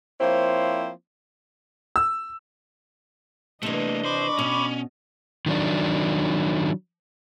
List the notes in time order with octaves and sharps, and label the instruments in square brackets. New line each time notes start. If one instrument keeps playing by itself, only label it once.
[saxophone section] F3 A#3 C4 E4 C5 C#5
[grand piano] E6
[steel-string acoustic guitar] C3 E3 [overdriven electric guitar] A3 A#3 [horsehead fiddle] D4 D#5
[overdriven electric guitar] C5 [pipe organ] B5 C#6 D6
[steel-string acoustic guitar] B2 [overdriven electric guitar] C#4
[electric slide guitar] D#3 F#3 D4